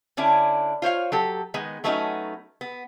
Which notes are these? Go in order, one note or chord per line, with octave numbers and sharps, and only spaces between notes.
D3 C#4 D4 E4
F4 C5 C#5 F5
F#3 G4 A4
D#3 G#3 B3
F#3 A3 B3 C#4 D#4 F#4
B3